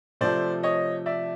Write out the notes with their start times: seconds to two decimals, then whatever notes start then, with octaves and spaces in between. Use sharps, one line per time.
0.21 C3 F3 A3 C5 D5
0.63 C#5 D#5
1.06 D5 E5